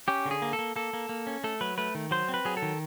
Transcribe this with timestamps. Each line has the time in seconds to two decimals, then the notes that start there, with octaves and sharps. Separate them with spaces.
0.08 C#4 G4
0.26 D3
0.31 G#4
0.42 A#3
0.53 A4
0.59 A#3
0.76 A#3 A4
0.93 A#3
1.09 A#3
1.27 C#4
1.44 A3 A4
1.61 F#3 B4
1.78 A3 B4
1.95 D#3
2.11 F#3 C5
2.29 C4
2.34 B4
2.45 F#3 G#4
2.57 A4
2.62 D#3